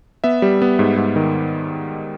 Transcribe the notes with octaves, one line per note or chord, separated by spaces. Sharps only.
B3 E5
G3
B3
G#2
G#2
D#3